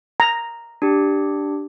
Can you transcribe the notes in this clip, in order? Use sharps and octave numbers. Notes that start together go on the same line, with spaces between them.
A#5
D4 G4